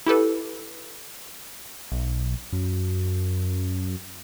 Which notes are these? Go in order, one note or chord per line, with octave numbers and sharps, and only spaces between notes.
E4 G4 A4 B4
B1
F#2